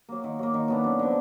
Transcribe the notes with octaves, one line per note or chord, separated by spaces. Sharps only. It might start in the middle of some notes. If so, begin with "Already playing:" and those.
F#3 A#3
D#3
F#3 A#3
D#3
F#3 B3 D4
F#2
D3 F3